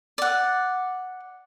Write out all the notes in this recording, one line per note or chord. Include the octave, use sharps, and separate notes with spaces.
D5 F#5